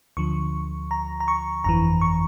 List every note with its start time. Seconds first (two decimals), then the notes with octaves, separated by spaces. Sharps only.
0.17 D2 D3 F3 C#6
0.91 A#5
1.20 A#5
1.28 C#6
1.64 G1 F2 E3 A#5
2.01 C#6